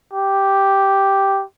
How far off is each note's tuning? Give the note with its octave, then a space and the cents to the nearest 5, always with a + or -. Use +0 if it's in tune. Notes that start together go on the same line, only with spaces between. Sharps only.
G4 +0